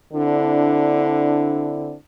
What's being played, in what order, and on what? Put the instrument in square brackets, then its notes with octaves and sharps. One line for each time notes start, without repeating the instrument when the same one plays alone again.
[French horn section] D3 C4 D4 E4